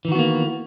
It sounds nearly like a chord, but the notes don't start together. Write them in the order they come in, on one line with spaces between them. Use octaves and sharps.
E3 D#3 F#4 B3 A#3